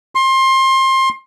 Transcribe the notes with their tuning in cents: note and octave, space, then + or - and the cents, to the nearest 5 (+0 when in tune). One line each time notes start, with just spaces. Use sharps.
C6 +25